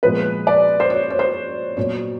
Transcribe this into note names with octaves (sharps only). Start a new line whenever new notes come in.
A#2 F3 G#3 B3 B4
D5
C5
C#5
C#5
C5
A#2 F#3 B3 C#5